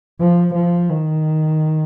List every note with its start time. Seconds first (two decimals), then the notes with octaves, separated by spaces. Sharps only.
0.20 F3
0.55 F3
0.89 D#3